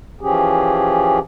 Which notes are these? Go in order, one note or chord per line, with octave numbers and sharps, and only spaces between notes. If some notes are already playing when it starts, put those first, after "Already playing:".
E3 F3 C#4 G4 G#4